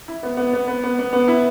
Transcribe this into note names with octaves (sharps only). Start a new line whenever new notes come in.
E4
B3
B3
B3
B3
B3
B3
B3
E4